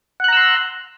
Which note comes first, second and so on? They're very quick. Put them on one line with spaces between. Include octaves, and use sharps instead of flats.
F#5 F#6 A#5 E6 C6